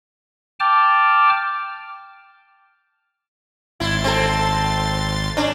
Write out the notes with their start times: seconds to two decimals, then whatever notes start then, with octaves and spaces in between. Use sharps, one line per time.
0.60 G5 A5 D6 F6
3.80 G#1 E4 C6 A6
4.04 C4 A4
5.37 C#4 D4